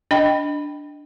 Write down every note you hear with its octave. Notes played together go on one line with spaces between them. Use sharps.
D4 D#5 G5 B5